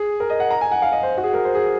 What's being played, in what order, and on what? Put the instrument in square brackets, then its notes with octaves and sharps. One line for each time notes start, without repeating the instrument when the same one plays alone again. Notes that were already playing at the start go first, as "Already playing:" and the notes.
Already playing: [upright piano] G#4
A#4
D#5
F#5
A#5
G#5
F#5
F5
D#5
C5
F#4
G#4
A#4
C5
G#4